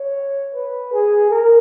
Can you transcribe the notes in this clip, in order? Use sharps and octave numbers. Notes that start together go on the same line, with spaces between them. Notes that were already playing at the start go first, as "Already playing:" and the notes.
Already playing: C#5
B4
G#4
A#4